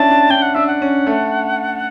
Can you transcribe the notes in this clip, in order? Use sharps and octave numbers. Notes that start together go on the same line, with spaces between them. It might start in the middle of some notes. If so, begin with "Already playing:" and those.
Already playing: C#4 D4 E4 A5
D4
D4 G5
F#5
D4 E5
F#5
C#4
A3